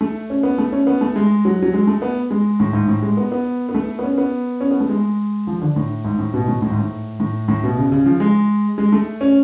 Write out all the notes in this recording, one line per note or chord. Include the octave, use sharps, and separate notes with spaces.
A3
C#4
B3
A3
C#4
B3
A3
G#3
F#3
F#3
G#3
A3
B3
G#3
A2
G#2
A2
G#3
B3
B3
B3
A3
B3
C#4
B3
C#4
B3
A3
G#3
F3
D3
A2
G#2
A2
B2
A2
A2
G#2
A2
A2
A2
B2
C#3
C#3
F3
G#3
G#3
A3
C#4